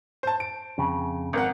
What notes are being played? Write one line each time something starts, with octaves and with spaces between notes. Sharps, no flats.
C5 A5
D7
F2 C#3
G#1 A#4 F#5